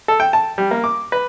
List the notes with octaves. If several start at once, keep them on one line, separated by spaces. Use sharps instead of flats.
A4
G5
A5
G3
A#3
D6
B4